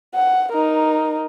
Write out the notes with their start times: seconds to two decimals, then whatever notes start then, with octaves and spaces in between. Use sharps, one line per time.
0.15 F#5
0.53 D#4 A#4